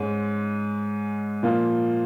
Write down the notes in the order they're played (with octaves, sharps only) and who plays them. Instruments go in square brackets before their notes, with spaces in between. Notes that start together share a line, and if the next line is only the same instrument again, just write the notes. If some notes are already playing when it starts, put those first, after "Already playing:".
Already playing: [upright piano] G#2 G#3 C#4
A#2 F3 A#3 F4